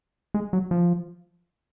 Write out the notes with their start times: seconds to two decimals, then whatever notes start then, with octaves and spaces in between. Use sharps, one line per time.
0.34 G#3
0.53 F#3
0.71 F3